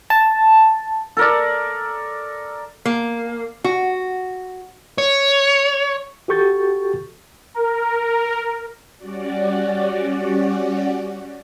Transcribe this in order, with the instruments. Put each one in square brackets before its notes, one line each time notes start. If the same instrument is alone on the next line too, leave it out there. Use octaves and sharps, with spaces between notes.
[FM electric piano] A5
[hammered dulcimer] A4 A#4 D5
[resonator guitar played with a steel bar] A#3
F#4
[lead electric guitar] C#5
[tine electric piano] F#4 G4 A4 C#6 G6 A6
[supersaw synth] A#4
[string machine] G3 C#4 F#4 D5